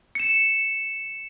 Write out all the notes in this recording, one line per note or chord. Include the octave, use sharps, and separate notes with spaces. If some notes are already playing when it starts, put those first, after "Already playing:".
C#7 E7